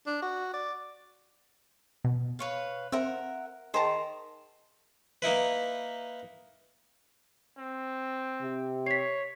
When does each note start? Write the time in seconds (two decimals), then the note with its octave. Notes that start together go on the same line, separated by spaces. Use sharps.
0.07 D4
0.22 F#4
0.54 D5
2.04 B2
2.39 B4 C#5 F5
2.92 C4 A#4 E5 F#5
3.74 D#3 G#4 C5 A5 A#5
5.22 A#3 D#4 E4 B4
7.58 C4
8.41 C3
8.86 C#5 B6 C7